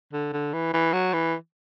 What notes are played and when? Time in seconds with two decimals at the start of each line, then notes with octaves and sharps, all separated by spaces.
0.13 D3
0.32 D3
0.53 E3
0.73 E3
0.93 F#3
1.13 E3